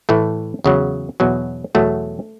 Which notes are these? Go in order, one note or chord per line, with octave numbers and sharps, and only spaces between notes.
A2 E3 A3
E2 C#3 F#3
E2 B2 F#3
E2 B2 F#3 A3